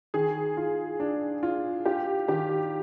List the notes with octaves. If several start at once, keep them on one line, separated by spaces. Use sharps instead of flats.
D#3 G#4
F4
D4
F4
F4 G4
D#3 G4